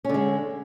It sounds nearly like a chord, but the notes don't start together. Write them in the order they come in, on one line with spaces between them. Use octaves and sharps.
C#4 D3 G#3